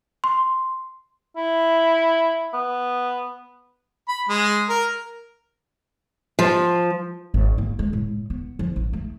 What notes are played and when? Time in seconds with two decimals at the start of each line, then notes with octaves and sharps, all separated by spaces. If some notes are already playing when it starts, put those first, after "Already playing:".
0.24 C6
1.37 E4
2.54 B3
4.08 B5
4.29 G#3
4.69 A#4
6.39 F3
7.34 G#1
7.58 A#3
7.79 G#3
7.93 A2
8.30 B3
8.59 F3
8.76 A1
8.93 A3